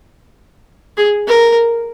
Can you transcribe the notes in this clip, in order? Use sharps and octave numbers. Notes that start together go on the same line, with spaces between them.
G#4
A#4